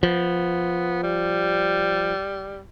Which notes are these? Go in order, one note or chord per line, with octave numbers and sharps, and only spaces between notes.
F3 B3
G3